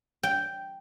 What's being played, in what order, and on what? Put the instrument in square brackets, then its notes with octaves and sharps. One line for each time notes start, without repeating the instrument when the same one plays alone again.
[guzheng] G5